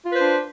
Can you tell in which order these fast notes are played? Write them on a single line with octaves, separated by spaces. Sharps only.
F4 B4 C5 D4